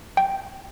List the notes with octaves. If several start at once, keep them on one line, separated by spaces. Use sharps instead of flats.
G5